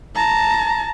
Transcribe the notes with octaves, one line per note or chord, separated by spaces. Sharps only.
A5 A#5